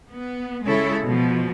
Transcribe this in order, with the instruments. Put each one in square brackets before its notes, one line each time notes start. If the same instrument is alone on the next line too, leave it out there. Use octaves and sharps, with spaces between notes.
[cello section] B3
C#3 G#3 E4 A4 C#5
B2 F3